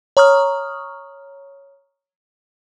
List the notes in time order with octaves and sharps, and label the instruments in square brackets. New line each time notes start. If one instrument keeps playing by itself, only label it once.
[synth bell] C#5 A#5 C#6 D#6 F6